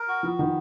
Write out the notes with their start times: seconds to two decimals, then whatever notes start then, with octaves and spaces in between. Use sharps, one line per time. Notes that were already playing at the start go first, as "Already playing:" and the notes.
Already playing: A#4
0.08 F#4
0.23 F3 B3
0.38 D#3 B3